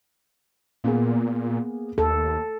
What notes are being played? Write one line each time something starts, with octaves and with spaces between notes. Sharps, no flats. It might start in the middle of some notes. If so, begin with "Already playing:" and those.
A#2 A#3 B3 G#4
D#2 A4